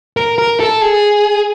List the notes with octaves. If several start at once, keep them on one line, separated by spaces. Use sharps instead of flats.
A#4
A#4
A4
G#4